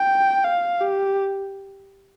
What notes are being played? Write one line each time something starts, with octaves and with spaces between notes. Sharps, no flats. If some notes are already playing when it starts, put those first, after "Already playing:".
Already playing: G5
F5
G4